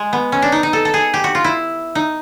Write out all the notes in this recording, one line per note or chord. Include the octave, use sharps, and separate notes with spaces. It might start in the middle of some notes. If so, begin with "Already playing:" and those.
Already playing: G#3
B3
C#4
D4
D#4
D#4
A4
A4
G#4
G4
F#4
F4
E4
D#4